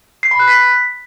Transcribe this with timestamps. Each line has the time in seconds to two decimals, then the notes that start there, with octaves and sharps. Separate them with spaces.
0.23 C7
0.31 B5
0.39 F#6
0.48 B6